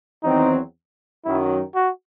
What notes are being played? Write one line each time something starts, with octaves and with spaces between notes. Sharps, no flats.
E2 D#3 F#3 C4 D#4
F#2 D#3 F#3 E4
F#4